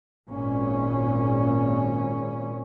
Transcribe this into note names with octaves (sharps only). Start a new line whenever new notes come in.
G#1 A#2 C#4